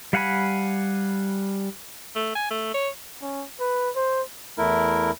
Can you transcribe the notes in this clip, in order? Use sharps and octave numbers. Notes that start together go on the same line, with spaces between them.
G3 F5 F#5 G#5 B5
A3
G#5
A3
C#5
C#4
B4
C5
E2 A3 E4 A#4